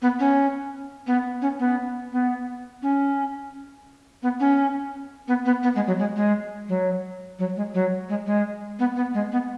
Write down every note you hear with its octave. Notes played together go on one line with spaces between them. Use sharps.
B3
C#4
B3
C#4
B3
B3
C#4
B3
C#4
B3
B3
B3
G#3
F#3
G#3
G#3
F#3
F#3
G#3
F#3
G#3
G#3
B3
B3
G#3
B3